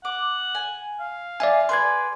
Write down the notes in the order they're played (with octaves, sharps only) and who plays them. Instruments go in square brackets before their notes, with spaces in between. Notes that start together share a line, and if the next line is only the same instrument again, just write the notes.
[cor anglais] F#5 [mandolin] D6
[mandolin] G#5
[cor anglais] F5
[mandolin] F4 [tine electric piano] D5 E5 G#5
[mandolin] G#4 B4 D5 [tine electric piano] C6 G#6